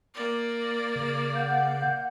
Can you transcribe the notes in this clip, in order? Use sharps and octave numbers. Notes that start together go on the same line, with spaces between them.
A#3 D5
C#3
F5 F#5 G6